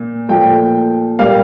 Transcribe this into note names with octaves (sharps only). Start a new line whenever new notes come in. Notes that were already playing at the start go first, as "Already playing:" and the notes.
Already playing: A#2
A#2 F3 A3 G5
A#2 G3 A#3 F5